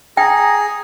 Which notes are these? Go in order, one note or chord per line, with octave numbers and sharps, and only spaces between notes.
G#4 G5 A#5